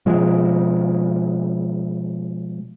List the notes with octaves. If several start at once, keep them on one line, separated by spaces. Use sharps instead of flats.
B2 F3 G#3